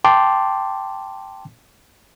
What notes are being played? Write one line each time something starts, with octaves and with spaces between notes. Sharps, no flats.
G5 A5 C6 D6